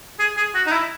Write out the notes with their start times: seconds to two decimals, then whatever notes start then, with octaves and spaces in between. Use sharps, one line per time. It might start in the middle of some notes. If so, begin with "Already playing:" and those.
0.19 G#4
0.37 G#4
0.55 F#4
0.66 D#4
0.72 E4